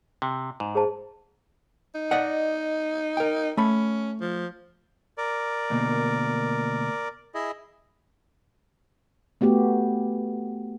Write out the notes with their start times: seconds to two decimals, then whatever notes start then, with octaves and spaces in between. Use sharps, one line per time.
0.22 C3
0.60 G#2
0.75 G#4 C5 A5
1.95 D#4
2.11 D5 D#5 F#5
3.17 A#4 G5
3.57 A3 C#4 B5
4.21 F3
5.18 A#4 D5
5.70 D2 B2 A#3
7.34 E4 G#4 D#5
9.41 A3 B3 F#4 G4